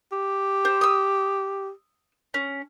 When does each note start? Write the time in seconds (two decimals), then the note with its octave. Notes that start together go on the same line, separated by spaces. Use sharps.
0.12 G4
0.65 C5
0.81 D#6 E6
2.34 C#4